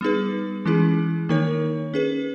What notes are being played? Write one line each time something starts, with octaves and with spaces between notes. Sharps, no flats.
G3 B3 D#4 G#4 B4
E3 G#3 C#4 E4 G#4
D#3 A#3 D#4 A#4 C#5
C#4 G#4 B4